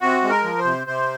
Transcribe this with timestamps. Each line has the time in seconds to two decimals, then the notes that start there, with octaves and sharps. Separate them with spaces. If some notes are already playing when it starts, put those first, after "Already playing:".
0.01 C3 F#4
0.23 G#3
0.30 A#4
0.44 F3
0.59 C5
0.65 C3
0.87 C3 C5